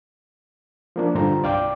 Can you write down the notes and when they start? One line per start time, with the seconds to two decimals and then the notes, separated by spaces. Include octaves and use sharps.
0.96 F3 A#3 D4
1.15 G2 D3 G3 F4 C5 A#5
1.43 C2 D5 F5 G5 D6